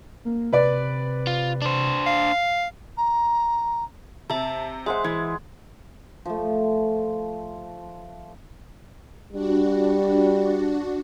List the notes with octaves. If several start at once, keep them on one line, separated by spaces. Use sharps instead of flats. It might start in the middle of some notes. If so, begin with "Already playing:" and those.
A#3
C3 B4 D5
F4
D4 C5
F5
A#5
C3 E5 A5
G#3 C5 E5 F#5
E3 G#6
F3 A3
G3 D4 F#4